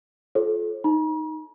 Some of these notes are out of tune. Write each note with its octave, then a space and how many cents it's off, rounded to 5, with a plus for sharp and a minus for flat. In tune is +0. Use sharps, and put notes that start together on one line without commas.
F4 +0 A4 -30 C5 +45
D#4 +0 A#5 +45